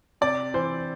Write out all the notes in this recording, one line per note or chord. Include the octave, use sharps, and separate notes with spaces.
C3 D5
E3 C5